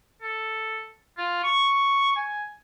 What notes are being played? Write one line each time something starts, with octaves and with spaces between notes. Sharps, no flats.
A4
F4
C#6
G#5